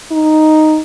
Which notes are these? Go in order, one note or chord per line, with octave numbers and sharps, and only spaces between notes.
D#4